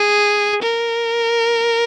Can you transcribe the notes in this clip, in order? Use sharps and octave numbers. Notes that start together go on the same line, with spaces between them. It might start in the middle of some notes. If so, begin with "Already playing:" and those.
Already playing: G#4
A#4